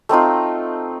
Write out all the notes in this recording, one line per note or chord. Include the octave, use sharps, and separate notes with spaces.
A3 C4 D#4 F4